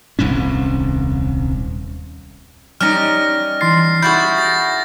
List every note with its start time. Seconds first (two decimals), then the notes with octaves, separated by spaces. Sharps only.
0.19 D#1 C2 G#2 C#4
2.81 G3 C#4 D#4 F6 A#6
3.61 E3 C6 A6 C7
4.02 E4 F#4 G#4 B5 C#6 G6 A6
4.38 A6 A#6